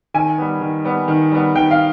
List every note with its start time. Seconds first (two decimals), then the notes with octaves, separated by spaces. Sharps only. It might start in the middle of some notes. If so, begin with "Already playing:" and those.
0.14 D#3 G#5
0.38 G3 B3
0.61 D#3
0.84 G3 B3
1.08 D#3
1.31 G3 B3
1.55 D#3 G5
1.71 F5